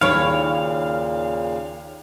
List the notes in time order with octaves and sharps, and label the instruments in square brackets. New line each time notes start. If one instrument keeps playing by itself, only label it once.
[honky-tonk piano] D#2 [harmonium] A#2 C#3 [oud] E4 C#5 [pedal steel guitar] F5